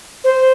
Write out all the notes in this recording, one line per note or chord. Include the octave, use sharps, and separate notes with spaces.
C5